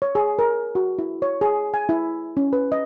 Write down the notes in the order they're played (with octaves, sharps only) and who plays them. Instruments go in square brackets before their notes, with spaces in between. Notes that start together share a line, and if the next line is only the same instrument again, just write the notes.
[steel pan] C#5
G#4
A#4
F#4
E4
C#5
G#4
G#5
E4
C#4
B4
D#5